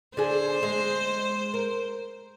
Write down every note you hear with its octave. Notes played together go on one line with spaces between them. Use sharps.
D3 G#4 C5
G#3
A#4